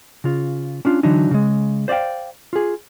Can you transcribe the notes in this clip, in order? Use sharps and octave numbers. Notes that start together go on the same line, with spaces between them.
C#3 F4
C#4 D4 F4
D3 E3 F#3 D4 D#4
C#3 G#3
C5 D5 D#5 F5 G5
F4 G#4